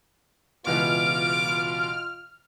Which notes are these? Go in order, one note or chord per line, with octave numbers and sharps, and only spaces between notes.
C#2 B2 E3 F4 D6 F6